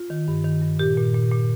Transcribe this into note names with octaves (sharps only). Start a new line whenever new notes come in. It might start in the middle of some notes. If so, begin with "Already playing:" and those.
Already playing: F4
D#3
G2
D#3
G2
A#2 G4
A#2
A#2
A#2